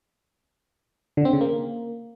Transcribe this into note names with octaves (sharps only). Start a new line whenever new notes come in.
D3
C4
C#3
A#3